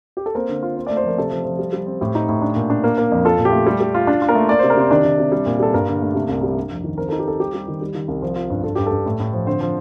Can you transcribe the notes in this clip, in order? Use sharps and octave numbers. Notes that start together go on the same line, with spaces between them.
G4
A4
A#3 C4 A#4
D3
F4
C4
A3 D5
C5
F3 A#4
C3 A4
F3
F3
G3
G3
C4
A2 G4
D#4
A2
D4
A#2
D4
A#3
A#3
F2
F4 A4
A#2
G4
A3
G3
G3
F4
D4
F4
A#3 A#4
A3
A#3 D5
C3 C5
A#4
C3 C4 C5
D#3 D4 D5
D#3
C3
G3
A#2
G3 A4
G2 A#3 A#4
D3
A3
C3
C2
G3
D4
F2
D#3
C4 A#4
D#4 A4
G4
C4 A4
G3 G4
G3
D#3
G3
D#3
C2
F3
F4
G2
G2 A4
G2 G4
G2 A4
A2
A2
F3
D3 C4 C5
F3